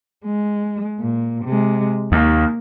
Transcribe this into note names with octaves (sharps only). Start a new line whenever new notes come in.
G#3
A#2
C3 G#3
D#2 A#3